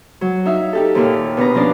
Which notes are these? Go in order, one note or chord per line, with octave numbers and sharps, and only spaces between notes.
F#3
D#4 E5 F5
D#4 G4 A4
D#2 A#2 F6
B2 D4 B4 A#5
F3 C#4 D4 F4 D5